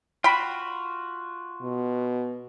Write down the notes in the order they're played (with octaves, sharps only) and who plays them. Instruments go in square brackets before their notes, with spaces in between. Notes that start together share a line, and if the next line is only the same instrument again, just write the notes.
[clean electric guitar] F4 F#4 [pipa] G5 B5
[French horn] B2